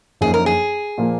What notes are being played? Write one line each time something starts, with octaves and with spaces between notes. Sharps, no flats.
F#2 F3 A#3 D#4 G#4
A#4
G#4
A#2 F3 A#3 F4